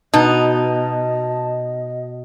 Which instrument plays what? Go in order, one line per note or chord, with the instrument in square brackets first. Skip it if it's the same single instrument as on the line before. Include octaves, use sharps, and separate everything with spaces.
[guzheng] B2 [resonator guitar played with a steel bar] D#4 [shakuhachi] D#5 [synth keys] A5